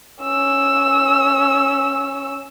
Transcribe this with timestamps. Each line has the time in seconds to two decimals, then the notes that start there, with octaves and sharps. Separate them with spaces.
0.23 C#4 E6